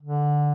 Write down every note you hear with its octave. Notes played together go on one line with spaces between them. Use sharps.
D3